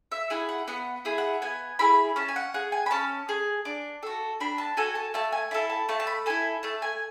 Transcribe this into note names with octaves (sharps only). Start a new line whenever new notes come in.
E5
E4 G#4 F#5
F#5
B3 F#5
E4 G#4
F#5
B3 G#5
E4 G#4 B5
C#4 A5
G#5
F#5
G#4 F#5
G#5
B5
C#4 A5
G#4
D4
F#4 A4
D4 B5
A5
F#4 A4 G#5
A5
A3 A5
G#5
E4 A4 A5
A5
A3 A5
A5
B5
E4 A4 G#5
A3 A5
G#5